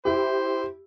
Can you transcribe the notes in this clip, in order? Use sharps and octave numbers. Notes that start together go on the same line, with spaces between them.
E4 G4 C5